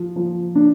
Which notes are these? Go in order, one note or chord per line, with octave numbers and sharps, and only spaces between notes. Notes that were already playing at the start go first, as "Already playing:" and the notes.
Already playing: F3
F3
D4